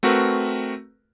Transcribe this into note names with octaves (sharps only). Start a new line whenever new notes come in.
A3 C4 F#4 A#4 B4